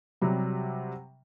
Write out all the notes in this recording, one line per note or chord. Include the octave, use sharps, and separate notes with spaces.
C3 F#3 G3